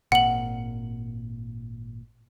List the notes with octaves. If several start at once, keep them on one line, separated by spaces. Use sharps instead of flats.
G#1 A#2 F#5 F#7